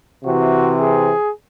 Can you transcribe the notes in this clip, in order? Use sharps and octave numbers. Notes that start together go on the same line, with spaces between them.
C3 E3 C4 F#4
G#4